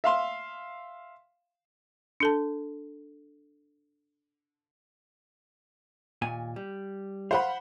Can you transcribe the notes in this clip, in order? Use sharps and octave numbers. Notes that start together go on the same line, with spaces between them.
E5 F5 C6
D4 A4 A5
D#2 A#2 G#5
G3
C5 F5 F#5 B5